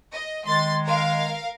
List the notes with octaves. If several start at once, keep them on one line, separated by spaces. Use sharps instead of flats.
D#5
D#3 G#3 C6 A6
A#4 F5